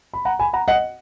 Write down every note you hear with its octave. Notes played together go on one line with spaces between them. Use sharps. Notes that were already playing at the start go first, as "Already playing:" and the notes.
B5
F#5 A#5
G#5 B5
F#5 A#5
D#5 F#5